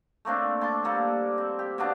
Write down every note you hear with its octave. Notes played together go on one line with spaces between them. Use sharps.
A3 A#3 C4 D4
A5 C6 D6
G3 A#3 A4
C4
G4
B2 A#3 B3 D4